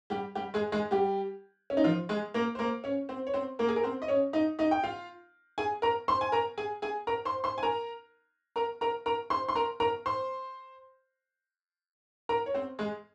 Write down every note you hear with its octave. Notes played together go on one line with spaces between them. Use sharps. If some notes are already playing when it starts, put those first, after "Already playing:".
G3 G4
G3 G4
G#3 G#4
G#3 G#4
G3 G4
C#4
D#4
F3 F4
G#3 G#4
A#3 A#4
C5
A#3 A#4
C#4 C#5
C4 C5
C#5
C4 C5
A#3 A#4
G#4
A#4
C4 C5
D#5
C#4 C#5
D#4 D#5
D#4 D#5
G5
F4 F5
G#4 G#5
A#4 A#5
C5 C6
G#5
A#4 A#5
G#4 G#5
G#4 G#5
A#4 A#5
C5 C6
C5 C6
G#5
A#4 A#5
A#4 A#5
A#4 A#5
A#4 A#5
C5 C6
C6
A#4 A#5
A#4 A#5
C5 C6
A#4 A#5
C#5
C4 C5
G#3 G#4